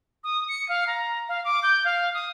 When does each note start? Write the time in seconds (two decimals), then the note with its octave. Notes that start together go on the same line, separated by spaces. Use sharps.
0.24 D#6
0.48 C#7
0.69 F5
0.87 A#5
1.29 F5
1.45 D6
1.63 G6
1.85 F5
2.14 D#6